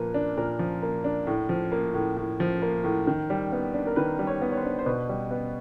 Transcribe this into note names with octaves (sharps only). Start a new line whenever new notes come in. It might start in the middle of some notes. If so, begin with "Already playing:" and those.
Already playing: A#2 F3 A#3 B4
D4
A#2 A#4
F3
A#3
D4
A2
F3
A#3
A2
A2
F3
A#3
A2
D#3
G3
B3
D4
A#4
D#3 B4
G3
C#5
B3
C#5
C5
D4
C5
B2 B4
G3
B3